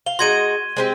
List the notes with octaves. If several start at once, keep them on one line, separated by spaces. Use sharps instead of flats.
F5 G7
G#3 D#4 F#4 C6 G#6 D#7
G#3 C4 G4